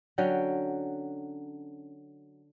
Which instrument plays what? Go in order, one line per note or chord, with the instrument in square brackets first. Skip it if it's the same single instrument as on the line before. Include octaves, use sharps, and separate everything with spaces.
[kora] D3 F#3 C#4 G5